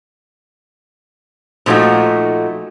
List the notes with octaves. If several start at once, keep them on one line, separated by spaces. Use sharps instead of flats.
A#2 F3 A3 D#4 F#4